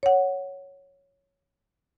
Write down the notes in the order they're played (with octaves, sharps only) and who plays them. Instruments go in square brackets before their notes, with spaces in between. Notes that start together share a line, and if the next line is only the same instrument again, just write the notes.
[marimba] C#5 F#5